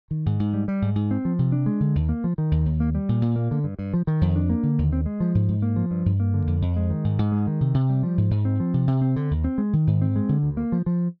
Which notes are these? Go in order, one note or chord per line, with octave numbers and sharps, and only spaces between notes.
D#3
G#2
G#2
G3
G3
G#2
G#2
C4
F3
C3
D4
G#3
D3
D#2
A#3
F3
D#3
D#2
D#2
A#3
G3
A#2
A#2
A#3
D3
G2
G2
F3
D#3
F2
D4
A#3
D3
D#2
C4
G#3
F3
G#2
G#2
A#3
F3
G2
G2
A#3
D3
F2
F2
G#3
D#3
G#2
G#2
G#3
D#3
C3
C3
G3
F3
G#2
G#2
C4
F3
C3
C3
C4
D3
D#2
C4
G#3
D#3
G#2
C4
G#3
D3
D2
A#3
F3
F3